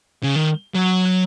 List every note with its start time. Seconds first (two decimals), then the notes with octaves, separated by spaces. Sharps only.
0.23 C#3
0.36 D#3
0.74 F#3